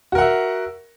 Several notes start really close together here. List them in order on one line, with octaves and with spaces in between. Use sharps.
F#4 A#4 F#5 E5